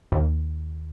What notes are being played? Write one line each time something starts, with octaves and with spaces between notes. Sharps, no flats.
D#2